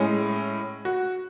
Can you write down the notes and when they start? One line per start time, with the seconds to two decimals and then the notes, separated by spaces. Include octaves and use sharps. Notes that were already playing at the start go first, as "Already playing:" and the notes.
Already playing: A2 G#3 C#4
0.85 F#4